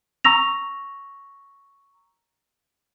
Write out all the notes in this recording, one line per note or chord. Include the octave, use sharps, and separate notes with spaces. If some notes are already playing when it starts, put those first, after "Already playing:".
A#5 C#6 E6 A#6 F7